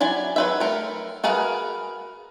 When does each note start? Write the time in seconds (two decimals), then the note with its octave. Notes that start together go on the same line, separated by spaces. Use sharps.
0.01 F#3 E4 D5 G#5
0.36 F#3 B4 E5
0.60 A3 A#4
1.24 F#4 G#4 A#4 B4 F5